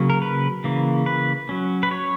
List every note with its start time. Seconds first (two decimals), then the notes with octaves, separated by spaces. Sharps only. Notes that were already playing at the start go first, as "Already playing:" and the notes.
Already playing: C#3 F#3 A#3 C#4
0.10 A#4
0.22 B4
0.64 C#3 E3 A#3
1.06 B4
1.49 F#3 C#4
1.83 B4
1.91 C#5